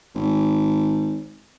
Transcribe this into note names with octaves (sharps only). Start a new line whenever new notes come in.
G#1